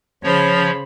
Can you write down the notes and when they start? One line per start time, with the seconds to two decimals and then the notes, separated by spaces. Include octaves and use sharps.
0.23 C#3 F3 C5 C#5 B5